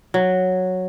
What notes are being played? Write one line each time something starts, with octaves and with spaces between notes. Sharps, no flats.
F#3